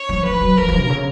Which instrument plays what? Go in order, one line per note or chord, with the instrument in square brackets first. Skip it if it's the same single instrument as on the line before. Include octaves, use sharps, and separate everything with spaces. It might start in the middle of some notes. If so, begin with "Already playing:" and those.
Already playing: [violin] C#5
[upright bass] F3
[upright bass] F3 [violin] B4
[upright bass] F#3
[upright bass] F3 [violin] A#4
[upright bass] F3
B2
C#3